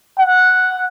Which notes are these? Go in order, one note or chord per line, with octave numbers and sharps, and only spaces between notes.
F#5